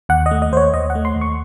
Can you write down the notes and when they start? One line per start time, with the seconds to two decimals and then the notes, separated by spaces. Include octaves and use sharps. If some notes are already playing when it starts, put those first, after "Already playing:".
0.09 D#2 F#5
0.26 D#5
0.31 A3
0.42 D#5
0.52 D#2 C5
0.57 C#5
0.74 D#2 D#5
0.90 F#5
0.95 A3
1.05 C6
1.16 D#2
1.21 C#6